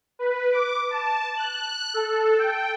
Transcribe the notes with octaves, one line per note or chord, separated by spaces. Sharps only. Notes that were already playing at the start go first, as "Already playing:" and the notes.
B4
D6
A5
F#6
A4
G5